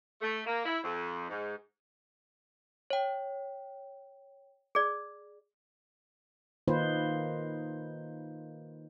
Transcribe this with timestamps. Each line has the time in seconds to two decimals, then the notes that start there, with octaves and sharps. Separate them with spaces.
0.22 A3
0.46 A#3
0.65 E4
0.84 F2
1.29 G#2
2.90 C#5 G5
4.75 G#4 D5
6.68 D#3 A#3 D#4 F4 B4 C5